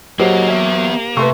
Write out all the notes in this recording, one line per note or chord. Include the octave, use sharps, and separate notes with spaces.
F#3 A#3 G4 G#4 C5 D#5 F#5
B3 E5
C3 A3 B4 C6 C#6